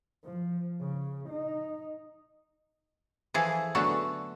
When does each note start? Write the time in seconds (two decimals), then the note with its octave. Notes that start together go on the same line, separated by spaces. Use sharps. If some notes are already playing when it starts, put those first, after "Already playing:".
0.24 F3
0.81 C#3
1.29 D#4
3.34 E3 F3 G#4 A4
3.75 D3 F#3 A3 B3 F#4 A4